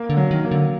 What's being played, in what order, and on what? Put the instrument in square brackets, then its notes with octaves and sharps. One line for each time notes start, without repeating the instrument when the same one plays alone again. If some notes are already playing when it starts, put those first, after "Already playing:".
Already playing: [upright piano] A#3
[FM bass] D3
[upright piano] F#3
[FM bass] D#3
[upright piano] A#3
[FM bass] D3